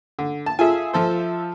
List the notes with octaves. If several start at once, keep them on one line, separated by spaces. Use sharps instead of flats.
D3
A5
F4 G#4 A4 E5 G#5
F3 A4 C5